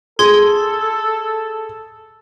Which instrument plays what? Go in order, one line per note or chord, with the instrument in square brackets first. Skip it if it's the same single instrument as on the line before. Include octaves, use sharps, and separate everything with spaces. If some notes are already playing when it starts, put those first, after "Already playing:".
[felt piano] G#4 [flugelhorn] A4 [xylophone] C6 G#6 G7